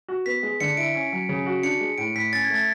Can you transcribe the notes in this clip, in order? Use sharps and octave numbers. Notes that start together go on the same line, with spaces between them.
F#4
B3 B6
G#3
D3 C#7
E4 D7
C#4
F#3
C#3
F#4
D4 C#7
G#3
A2 D7
A2 B6
C#4 A6
G#6
A3
A6